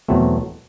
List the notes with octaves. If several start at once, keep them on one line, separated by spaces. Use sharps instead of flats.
E2 B2 F#3 A3 C4